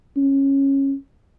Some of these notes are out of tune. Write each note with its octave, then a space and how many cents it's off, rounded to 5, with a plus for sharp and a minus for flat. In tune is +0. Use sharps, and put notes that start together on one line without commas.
C#4 -15